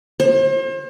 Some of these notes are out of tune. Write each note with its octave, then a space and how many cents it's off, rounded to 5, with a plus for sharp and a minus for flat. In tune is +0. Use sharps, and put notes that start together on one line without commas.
C5 +40